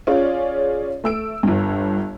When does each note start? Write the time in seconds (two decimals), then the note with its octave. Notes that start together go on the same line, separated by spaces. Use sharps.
0.07 C#4 F4 G#4 C#5 D5
1.04 A3 E6 D7
1.43 G1 G2